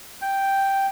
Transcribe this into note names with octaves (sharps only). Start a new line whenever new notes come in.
G5